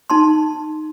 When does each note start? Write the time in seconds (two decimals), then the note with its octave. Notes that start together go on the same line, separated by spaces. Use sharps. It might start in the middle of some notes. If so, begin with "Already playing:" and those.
0.10 D#4 A5 C6